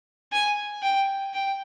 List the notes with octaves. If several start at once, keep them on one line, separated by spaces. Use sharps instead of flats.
G#5
G5
G5